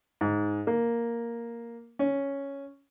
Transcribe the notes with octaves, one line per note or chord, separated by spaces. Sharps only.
G#2
A#3
C#4